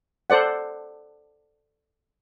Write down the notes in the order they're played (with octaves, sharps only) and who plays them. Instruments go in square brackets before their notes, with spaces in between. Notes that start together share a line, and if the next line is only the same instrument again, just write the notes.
[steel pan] A4 C5 D5 F#5